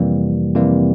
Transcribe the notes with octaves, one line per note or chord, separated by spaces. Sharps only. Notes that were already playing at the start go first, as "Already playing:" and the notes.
Already playing: F2 C3 E3 G3 A#3
F2 C3 E3 G3 A#3